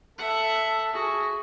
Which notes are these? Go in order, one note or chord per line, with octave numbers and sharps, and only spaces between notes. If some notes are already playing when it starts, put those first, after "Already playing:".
A4 E5 F#5
F#4 G#4